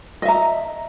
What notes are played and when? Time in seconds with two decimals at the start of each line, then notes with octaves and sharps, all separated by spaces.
0.22 D#5
0.25 E5
0.28 A#5